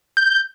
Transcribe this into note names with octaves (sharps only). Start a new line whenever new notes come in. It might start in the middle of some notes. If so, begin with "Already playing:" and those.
G6